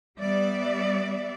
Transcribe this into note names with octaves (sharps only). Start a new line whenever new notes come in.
G3 B3 D5 E5